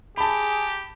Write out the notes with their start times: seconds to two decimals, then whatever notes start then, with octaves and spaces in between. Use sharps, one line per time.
0.18 G4 G#4 A5 B5